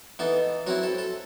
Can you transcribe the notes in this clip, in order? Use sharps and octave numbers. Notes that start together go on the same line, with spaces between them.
E3 B3 D#4 A4
F#3 C4 E4 F#4
A4
A4